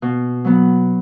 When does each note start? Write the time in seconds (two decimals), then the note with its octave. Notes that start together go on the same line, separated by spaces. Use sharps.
0.02 B2
0.45 F#3 B3